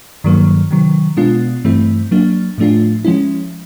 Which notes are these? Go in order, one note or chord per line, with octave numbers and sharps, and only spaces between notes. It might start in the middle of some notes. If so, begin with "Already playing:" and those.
G2 D#3 F#3 A#3
C3 D#3 F#3
B2 G#3 B3 D4 F4
G2 E3 A3 C4 E4
F#3 A#3 D4
A2 F3 A3 D4 F4
F3 G#3 C#4 E4